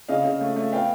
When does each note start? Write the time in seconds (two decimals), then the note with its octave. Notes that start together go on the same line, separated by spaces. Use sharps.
0.08 C#3 D#5 F5
0.25 C#3
0.41 A3
0.56 A3
0.72 B3 F5 G5